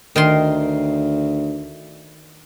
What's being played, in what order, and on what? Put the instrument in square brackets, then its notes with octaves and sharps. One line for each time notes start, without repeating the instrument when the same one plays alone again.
[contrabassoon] D2 [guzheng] D#3 A#4 C6